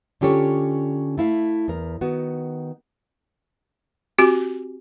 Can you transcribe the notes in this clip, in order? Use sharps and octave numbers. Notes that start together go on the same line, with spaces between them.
D3 C#4 F4 G4 A4 C#5
A3 E4 F5
E2 A#4
D#3 B3 F#4
C4 F#4 G4